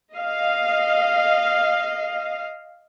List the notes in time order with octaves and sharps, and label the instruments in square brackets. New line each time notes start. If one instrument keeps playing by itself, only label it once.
[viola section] D#5 F5